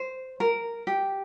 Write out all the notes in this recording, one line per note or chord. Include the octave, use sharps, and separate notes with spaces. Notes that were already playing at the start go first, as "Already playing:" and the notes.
Already playing: C5
A#4
G4